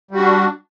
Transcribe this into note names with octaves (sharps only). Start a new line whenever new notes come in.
G3 D4 F#4